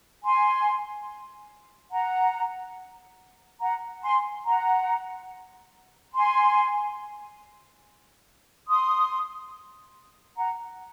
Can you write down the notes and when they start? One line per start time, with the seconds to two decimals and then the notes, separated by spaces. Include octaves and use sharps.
0.23 G#5 C6
1.91 F#5 A#5
3.60 F#5 A#5
4.03 G#5 C6
4.45 F#5 A#5
6.14 G#5 C6
8.68 C6 D#6
10.36 F#5 A#5